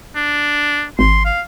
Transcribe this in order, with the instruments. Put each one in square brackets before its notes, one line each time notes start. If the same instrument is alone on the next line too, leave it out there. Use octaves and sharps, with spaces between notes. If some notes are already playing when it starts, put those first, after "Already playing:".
[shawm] D4
[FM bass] G#1 [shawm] C6
[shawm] F5